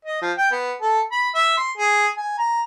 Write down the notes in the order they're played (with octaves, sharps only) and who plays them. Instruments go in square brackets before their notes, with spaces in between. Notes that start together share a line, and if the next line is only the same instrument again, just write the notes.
[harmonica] D#5
F3
G5
B3
A4
B5
E5
C6
G#4
G#5
A#5